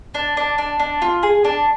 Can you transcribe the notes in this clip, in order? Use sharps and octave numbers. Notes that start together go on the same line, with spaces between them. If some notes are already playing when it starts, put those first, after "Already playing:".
D4
D4
D4
D4
F4
G#4
D4